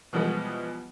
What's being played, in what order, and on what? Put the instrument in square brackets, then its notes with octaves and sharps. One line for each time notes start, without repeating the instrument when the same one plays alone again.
[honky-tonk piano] B2 E3 F3 G3 G#3 B3